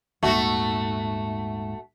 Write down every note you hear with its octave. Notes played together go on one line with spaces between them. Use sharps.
D#1 G#2 A3 F#4